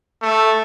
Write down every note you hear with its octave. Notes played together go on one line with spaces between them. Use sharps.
A3